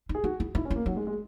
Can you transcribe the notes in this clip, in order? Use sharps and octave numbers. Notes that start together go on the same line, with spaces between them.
D#4
G#4
D#4 F#4
E4
D#4 E4
C#4
E4
A#3
F#3 D#4
G#3
G#3